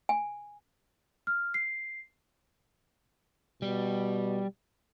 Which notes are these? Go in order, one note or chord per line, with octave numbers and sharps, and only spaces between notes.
G#5
F6
C7
B2 G3